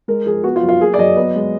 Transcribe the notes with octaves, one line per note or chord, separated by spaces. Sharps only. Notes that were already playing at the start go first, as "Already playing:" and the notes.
G#3 A#4
F3 G#4
B3 F#4
F4
F#3
F4
A#3 G#4
D5
F#3 D#5
B3
G#3